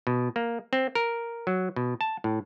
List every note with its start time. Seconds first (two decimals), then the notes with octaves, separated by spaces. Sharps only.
0.07 B2
0.36 A#3
0.73 C4
0.95 A#4
1.47 F#3
1.76 B2
2.01 A5
2.24 A2